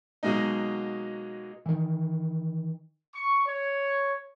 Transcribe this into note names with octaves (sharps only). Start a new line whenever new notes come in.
B2 F#3 G#3 A#3 D#4
D#3 E3
C#6
C#5